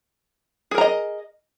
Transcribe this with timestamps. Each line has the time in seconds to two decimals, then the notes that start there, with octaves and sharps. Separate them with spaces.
0.71 G#4
0.75 A#4
0.78 A#5
0.81 D#5